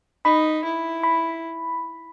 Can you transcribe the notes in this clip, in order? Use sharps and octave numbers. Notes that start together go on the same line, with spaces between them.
D#4 B5
E4
B5